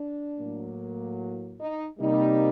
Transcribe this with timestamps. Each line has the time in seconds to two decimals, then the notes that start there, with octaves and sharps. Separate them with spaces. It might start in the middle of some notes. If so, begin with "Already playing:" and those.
Already playing: D4
0.39 A2 F#3 A#3
1.60 D#4
1.99 C3 G3 A#3 D#4